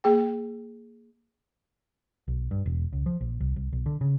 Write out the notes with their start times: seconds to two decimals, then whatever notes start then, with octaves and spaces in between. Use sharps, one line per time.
0.04 A#3 G#4 G5
2.28 B1
2.51 G2
2.66 E1
2.92 C#2
3.06 F3
3.21 A#1
3.40 C2
3.56 C2
3.73 B1
3.86 D3
4.01 C#3